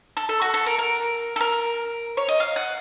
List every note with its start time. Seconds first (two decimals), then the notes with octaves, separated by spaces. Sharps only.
0.17 A4
0.29 A4
0.42 F#4
0.54 A4
0.66 A#4
0.78 A#4
1.36 A4
1.40 A#4
2.17 C#5
2.28 D#5
2.40 F5
2.56 F#5